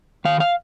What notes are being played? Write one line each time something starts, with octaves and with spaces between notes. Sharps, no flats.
D#3 F5
F5